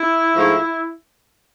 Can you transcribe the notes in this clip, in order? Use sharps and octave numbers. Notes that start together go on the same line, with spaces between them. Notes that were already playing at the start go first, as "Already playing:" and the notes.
Already playing: E4
G#2 F3 A3